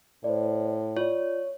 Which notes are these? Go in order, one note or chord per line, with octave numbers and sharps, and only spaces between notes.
A2 C5 D5
F4 C#5 D5